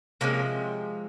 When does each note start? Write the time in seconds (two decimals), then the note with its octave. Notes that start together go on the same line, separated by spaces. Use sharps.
0.21 C3 F3 G#3 A#3 C#4